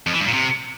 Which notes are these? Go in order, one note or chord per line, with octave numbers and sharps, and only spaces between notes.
F2
E3
G2
A#2
C3